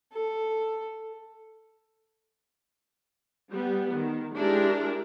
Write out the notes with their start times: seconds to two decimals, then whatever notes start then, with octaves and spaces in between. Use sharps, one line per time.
0.12 A4
3.50 G3 B3
3.93 D#3
4.35 G#3 D4 E4 G4 G#4 A#4